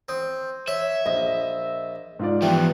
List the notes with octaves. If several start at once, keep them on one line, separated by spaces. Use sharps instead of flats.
C4 D#6
C#5 E5
A#1 D#5
G#2 F4 D5
E3 F3 B3 G4 G5